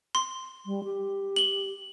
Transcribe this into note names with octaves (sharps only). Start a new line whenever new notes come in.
C6
G3
G4
F#7 G7